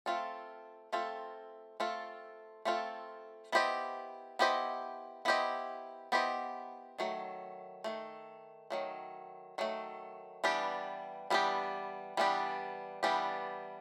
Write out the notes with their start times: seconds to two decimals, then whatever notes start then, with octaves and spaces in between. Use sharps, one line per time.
0.06 A3 C4 F4 A4
0.93 A3 C4 F4 A4
1.80 A3 C4 F4 A4
2.65 A3 C4 F4 A4
3.52 B3 E4 G4 C5 D#5
4.39 B3 E4 G4 C5 D#5
5.25 B3 E4 G4 C5 D#5
6.12 B3 E4 G4 C5 D#5
6.99 D#3 F#3 A3
7.84 D#3 F#3 A3
8.70 D#3 F#3 A3
9.58 D#3 F#3 A3
10.44 E3 G3 B3 D4 G4
11.30 E3 G3 B3 D4 G4
12.17 E3 G3 B3 D4 G4
13.03 E3 G3 B3 D4 G4